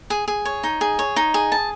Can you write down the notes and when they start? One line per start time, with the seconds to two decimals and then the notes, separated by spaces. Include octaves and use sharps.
0.10 G#4
0.28 G#4
0.45 C#5
0.63 D#4
0.81 G#4
0.99 C#5
1.16 D#4
1.34 G#4
1.52 A5